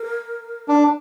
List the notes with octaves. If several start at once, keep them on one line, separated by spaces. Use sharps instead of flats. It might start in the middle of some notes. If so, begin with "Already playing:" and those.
Already playing: A#4
D4